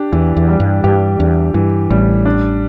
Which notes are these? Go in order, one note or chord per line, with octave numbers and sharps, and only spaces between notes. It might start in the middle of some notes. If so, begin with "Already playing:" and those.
Already playing: D4 G4
E2 E3
E2
G3
G2
G2 G4
E2 D4
G2 E3
A1 A2 G3
D4